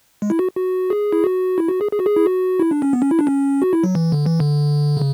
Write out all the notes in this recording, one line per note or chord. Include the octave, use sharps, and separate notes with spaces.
G#3
E4
F#4
F#4
G#4
E4
F#4
E4
F#4
G#4
G#4
F#4
G#4
E4
F#4
E4
D4
C#4
B3
C#4
E4
D4
C#4
F#4
E4
F#3
E3
D3
E3
D3
C#3